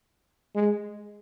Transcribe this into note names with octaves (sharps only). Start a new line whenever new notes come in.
G#3